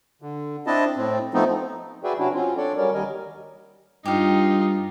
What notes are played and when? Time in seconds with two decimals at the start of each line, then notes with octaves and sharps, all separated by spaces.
0.22 D3
0.67 C4 D4 E4 D#5 A5
0.96 A2 C4
1.34 F3 A3 B3 C4 D#4
2.04 F#4 G#4 B4 D5 E5 G5
2.18 C3 F#3 C#4 D4 E4 F#4
2.34 F#3 C4 C#4 F4
2.57 D4 A4 C#5 D5
2.76 F#3 G3 C#4 A#4 C#5 D5
2.94 D#2 D#3 G3 A#4 D#5 G#5
4.05 G2 D#4 F4 G4 F5